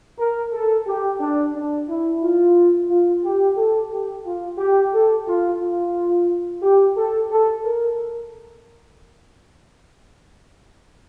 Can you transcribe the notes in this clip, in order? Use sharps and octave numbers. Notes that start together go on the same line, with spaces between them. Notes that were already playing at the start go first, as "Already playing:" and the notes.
A#4
A4
G4
D4
D4
E4
F4
F4
G4
A4
G4
F4
G4
A4
F4
F4
G4
A4
A4
A#4